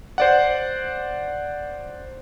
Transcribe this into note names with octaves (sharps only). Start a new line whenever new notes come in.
C5 D5 F#5